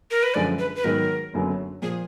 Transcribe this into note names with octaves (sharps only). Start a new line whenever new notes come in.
A#4
B4
F#2 D3 F3 G#3 D5
B4
B4
G#2 D#3 F#3 B3 A#4
F#1 F#2 D3 F#3 B3
A#2 F3 G#4